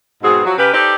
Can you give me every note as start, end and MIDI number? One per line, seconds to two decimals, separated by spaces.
0.23 0.41 44
0.23 0.41 47
0.23 0.41 59
0.23 0.41 60
0.23 0.41 66
0.23 0.41 68
0.45 0.56 53
0.45 0.56 54
0.45 0.56 60
0.45 0.56 66
0.57 0.71 49
0.57 0.71 67
0.57 0.71 70
0.57 0.71 71
0.73 0.95 63
0.73 0.95 67
0.73 0.95 69
0.73 0.95 71
0.73 0.95 72
0.73 0.95 74